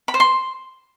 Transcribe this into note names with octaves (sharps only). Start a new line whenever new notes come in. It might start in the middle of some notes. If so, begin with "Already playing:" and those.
B5
C5
C6